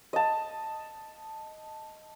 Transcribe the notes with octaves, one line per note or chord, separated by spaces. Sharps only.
D#5 A5